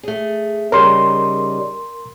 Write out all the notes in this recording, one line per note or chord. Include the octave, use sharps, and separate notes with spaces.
A3 G#4
C#3 G3 D#4 A#4 C6